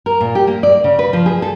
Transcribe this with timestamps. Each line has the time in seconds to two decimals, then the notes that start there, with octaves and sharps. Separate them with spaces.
0.06 A#4
0.21 A#2
0.35 G4
0.47 A#3
0.63 D5
0.84 C#3
0.99 B4
1.13 F3
1.26 G#4
1.42 A4